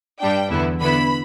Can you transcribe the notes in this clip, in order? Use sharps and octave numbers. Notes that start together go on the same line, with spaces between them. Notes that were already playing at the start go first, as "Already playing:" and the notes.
G2 G3 D4 G5
E2 D3 B3 E4
D3 B3 E4 B5